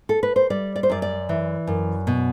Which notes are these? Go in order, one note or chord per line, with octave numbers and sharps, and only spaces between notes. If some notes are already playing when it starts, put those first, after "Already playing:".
A4
B4
C5
G3 D5
D5
C5
F#2 D5
D5
E3
F#2
B2